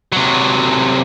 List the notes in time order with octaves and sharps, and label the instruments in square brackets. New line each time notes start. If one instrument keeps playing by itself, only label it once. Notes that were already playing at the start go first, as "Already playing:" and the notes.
[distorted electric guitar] C3 F#3